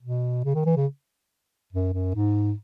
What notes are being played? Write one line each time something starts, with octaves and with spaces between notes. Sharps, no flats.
B2
C#3
D#3
E3
C#3
F#2
F#2
G#2